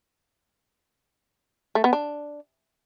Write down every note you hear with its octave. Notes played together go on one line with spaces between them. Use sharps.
A3
B3
D4